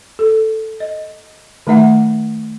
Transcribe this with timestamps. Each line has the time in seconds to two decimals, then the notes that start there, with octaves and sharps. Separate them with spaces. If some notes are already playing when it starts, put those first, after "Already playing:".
0.19 A4
0.80 D#5
1.67 D#3 A3 D#4 E5 F#5